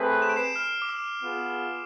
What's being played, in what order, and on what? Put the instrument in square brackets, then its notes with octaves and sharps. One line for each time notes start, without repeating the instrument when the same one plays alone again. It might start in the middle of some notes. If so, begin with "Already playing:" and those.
Already playing: [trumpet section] A3 C4 G#4 B4
[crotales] E7
D7
C7 E7
F6
D6
E6
[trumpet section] B3 F4 G#4